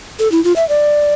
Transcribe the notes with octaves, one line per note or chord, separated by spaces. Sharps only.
A4
E4
F4
E5
D5